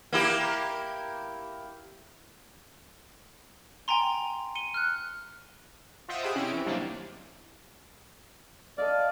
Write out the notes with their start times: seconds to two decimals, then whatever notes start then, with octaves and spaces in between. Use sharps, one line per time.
0.13 A#3 E4 G4
3.88 G5 G#5 A#5 C6
4.55 C#7 D#7 G7
4.74 F6 F#6
6.08 F4 C5 D#5 E5 F#5 G5
6.22 G4 G#4 B5 D#6
6.35 C3 C#4 E4 D7
6.52 E3
6.66 C3 D#3 F#3 G3 A#3 D4
8.78 A4 D5 D#5 F5